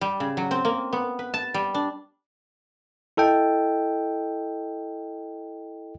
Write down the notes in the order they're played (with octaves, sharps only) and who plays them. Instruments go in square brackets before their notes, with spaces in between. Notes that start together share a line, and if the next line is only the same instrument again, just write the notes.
[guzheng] G3
C#3
F#3
C4
A#3
B3
B4
A5
G3
D4
[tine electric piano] E4 A4 D#5 G5